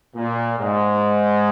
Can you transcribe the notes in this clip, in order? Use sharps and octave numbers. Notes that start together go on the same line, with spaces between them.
A#2
G#2